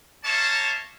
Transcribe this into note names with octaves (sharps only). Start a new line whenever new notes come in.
A#3 C#5 E5 A5